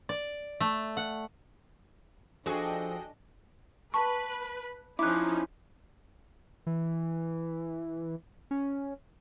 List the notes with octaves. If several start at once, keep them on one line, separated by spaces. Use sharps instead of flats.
D5
A3
F#5
F3 D4 F#4 G#4 A4 D#5 G5
B4 A5 C#6
F3 C#4 D#4 E4 D6 F#6
E3
C#4